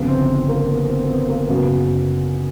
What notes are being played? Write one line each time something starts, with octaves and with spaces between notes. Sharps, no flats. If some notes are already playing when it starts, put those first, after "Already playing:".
Already playing: G1 F2 C#3 B3
C4
A#3
B3
C4
B3
C4
A#3
F#2 C#3 F#3 B3